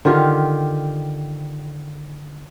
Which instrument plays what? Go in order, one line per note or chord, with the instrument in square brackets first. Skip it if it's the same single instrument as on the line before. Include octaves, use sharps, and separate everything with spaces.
[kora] D3 D#3 F4 G4